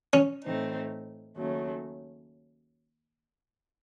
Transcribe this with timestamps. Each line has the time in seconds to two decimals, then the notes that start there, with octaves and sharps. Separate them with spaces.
0.13 C#4
0.44 A2 E3 A3 C4 D#4
1.37 D#2 C#3 F#3 A3